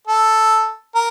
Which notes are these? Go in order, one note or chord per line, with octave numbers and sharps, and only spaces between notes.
A4
A#4